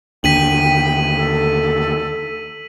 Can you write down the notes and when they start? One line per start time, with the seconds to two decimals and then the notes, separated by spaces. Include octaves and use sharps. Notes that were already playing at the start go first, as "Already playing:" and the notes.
0.24 D#2 D3 G5 B6 D#7 F#7
1.15 A4